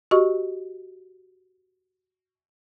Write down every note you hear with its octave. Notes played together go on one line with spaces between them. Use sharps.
F#4 G4 D#5 C#6